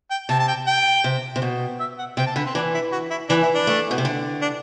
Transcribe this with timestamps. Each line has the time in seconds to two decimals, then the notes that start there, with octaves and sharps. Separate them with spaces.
0.11 G5
0.29 C3 A5
0.39 A5
0.48 G5
0.67 G5
1.04 C3
1.36 C3
1.42 B2
1.80 E5
1.99 F#5
2.17 C3 G5
2.27 A5
2.36 D3 B4
2.46 C4
2.55 E3 D4
2.74 E4
2.92 F#4
3.10 E4
3.29 E3 D4
3.43 E4
3.54 D4
3.67 A3
3.91 B2
3.98 C3
4.05 D3
4.42 D4